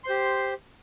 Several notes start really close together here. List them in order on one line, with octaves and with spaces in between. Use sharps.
C6 C5 G4